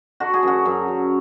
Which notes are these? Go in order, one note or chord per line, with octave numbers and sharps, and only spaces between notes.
D3 F#4
G#4
F#2 F#4
F#2
F#2